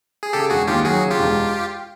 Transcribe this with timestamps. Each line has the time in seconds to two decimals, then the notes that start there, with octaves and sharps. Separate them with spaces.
0.23 G#4
0.33 C#3 G4 A4
0.50 E1 F#4 G#4
0.67 D#2 F4 G4
0.85 F#3 F#4 G#4
1.02 C#3
1.10 F4 G4
1.19 E1